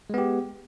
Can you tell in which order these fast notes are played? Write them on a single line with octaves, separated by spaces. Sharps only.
G#3 B3 G4